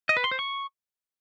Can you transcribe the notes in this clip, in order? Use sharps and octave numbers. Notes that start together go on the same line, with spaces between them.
D#5
B4
C6
C5
C#6